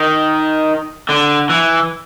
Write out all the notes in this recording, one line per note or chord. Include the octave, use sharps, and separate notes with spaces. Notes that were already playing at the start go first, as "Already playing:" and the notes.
Already playing: D#3
D3
E3